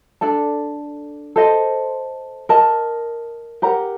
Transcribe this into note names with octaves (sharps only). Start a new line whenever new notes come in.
D4 A4 D5 A5
A4 C5 D#5
A#4 D#5 A5
G4 A#4 F#5 A#5